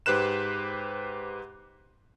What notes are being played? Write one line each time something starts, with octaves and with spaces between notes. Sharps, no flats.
G#2 G4 B4 C5 F#6 E7